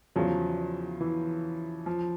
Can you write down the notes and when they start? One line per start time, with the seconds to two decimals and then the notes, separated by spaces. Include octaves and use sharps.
0.16 E2 C#3 F3 F#3
1.01 E3
1.86 F3